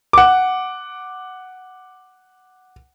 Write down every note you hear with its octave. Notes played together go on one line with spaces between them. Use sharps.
F#5 D6